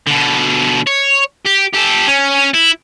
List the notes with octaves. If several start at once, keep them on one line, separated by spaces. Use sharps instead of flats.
B2 D3
C#5
G4
G4 A4
C#4
E4